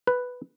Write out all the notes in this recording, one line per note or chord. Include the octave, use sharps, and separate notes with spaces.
B4